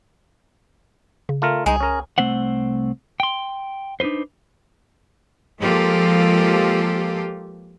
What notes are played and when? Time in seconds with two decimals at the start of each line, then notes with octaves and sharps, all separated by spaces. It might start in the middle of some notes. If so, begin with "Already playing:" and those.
1.29 C#3
1.42 A3 F4 A#4
1.66 C2 G#3 D#4 G#4
1.80 C#4 A#4
2.18 C2 A3 C4 C5 F#5
3.20 G5 C6
4.00 D4 D#4 F#4 B4 C5
5.58 F3 G#3 A#3 F4 G4 A4